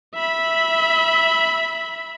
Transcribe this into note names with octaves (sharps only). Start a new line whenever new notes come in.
E5 B5